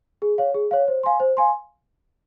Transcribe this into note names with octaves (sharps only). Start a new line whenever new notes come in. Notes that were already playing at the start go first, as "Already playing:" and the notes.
G#4
C#5 F5
G#4
C#5 F5
C5
F5 G#5 C6
C5
F5 G#5 C6